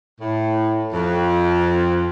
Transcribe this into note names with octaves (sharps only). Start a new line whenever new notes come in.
A2
F2